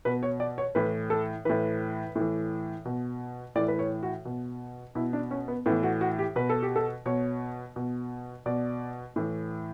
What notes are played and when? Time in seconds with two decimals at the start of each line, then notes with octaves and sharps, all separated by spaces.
0.05 B2 B4
0.23 C#5
0.40 D5
0.58 C#5
0.75 A2 E3 B4
1.10 A4
1.45 A2 E3 B4
2.16 A2 E3
2.85 B2
3.55 A2 E3 D5
3.68 B4
3.79 C#5
4.03 F#4
4.25 B2
4.95 B2 E4
5.13 D4
5.31 C#4
5.48 B3
5.66 A2 E3 B3
5.83 F#4
6.01 F#4
6.19 G4
6.36 B2 B4
6.50 A4
6.63 G4
6.76 A4
7.06 B2 C#5
7.76 B2
8.46 B2 D5
9.16 A2 E3